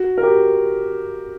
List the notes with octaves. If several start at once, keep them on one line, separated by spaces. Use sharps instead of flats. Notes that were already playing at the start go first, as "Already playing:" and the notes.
Already playing: F#4
A#4
G4